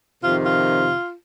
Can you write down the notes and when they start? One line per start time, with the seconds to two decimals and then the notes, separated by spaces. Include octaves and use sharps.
0.22 F2 C3 D#3 F4
0.46 F4